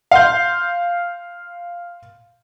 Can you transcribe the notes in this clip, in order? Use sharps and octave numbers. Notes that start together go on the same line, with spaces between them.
F5 C6 G6